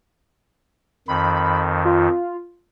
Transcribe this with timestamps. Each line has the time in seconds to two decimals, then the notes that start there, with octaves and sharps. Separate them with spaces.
1.08 F2 D#3 B5
1.85 F4